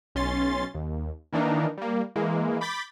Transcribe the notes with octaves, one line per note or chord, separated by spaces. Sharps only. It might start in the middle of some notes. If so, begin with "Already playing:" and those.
B1 C#4 C6 A6
D#2
D#3 E3 A#3 D4 D#4 A#4
G3 A#3
E3 G#3 A#3
B5 D6 G6 A6 B6